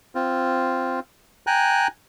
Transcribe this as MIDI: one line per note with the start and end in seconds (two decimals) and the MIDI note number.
0.15 1.00 60
0.15 1.00 65
1.47 1.88 79
1.47 1.88 80
1.47 1.88 82
1.47 1.88 90